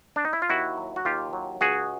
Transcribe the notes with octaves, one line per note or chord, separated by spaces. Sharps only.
D4
D#4
E4
F4
D#2 E4 F#4
F#3
F#4
D#2 F4 G4
F#3
C#2 F#4 G#4